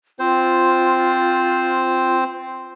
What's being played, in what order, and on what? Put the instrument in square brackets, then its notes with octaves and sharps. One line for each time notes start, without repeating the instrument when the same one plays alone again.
[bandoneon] C4 C5 [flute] F4